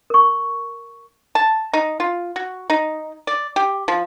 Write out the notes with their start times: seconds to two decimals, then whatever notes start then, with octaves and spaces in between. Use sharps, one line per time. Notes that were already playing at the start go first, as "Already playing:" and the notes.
0.10 A#4 C#6
1.35 A5
1.73 D#4
2.00 F4
2.36 F#4
2.70 D#4
3.27 D5
3.56 G4
3.88 F3